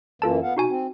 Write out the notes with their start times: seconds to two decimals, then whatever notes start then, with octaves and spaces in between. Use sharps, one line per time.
0.22 F#2 E3 A#3 F4 A4 A5
0.43 B3 F5 F#5
0.57 B2 D#4 F#4 G#5
0.69 C4